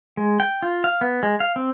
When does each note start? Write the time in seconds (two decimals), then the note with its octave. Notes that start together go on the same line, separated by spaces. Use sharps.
0.17 G#3
0.40 G5
0.62 F4
0.84 F5
1.01 B3
1.23 G#3
1.40 F5
1.56 C4